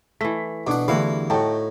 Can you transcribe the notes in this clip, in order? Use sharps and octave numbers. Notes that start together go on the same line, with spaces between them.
E3 A3 B6
B2 D4 F#5 D6
E2 D3 G3 A3 E4 F#4 F5
A2 D#4 F#4 G5 A5